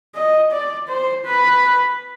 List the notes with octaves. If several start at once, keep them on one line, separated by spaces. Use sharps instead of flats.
D#5
D5
C5
B4